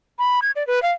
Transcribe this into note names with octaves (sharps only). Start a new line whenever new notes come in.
B5
G#6
D5
B4
F5